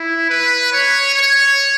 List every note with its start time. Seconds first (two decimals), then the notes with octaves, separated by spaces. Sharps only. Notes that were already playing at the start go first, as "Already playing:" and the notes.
Already playing: E4
0.30 B4
0.72 C#5
1.14 C#5